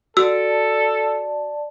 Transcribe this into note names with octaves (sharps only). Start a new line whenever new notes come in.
F#4 A4 D5 A5 E6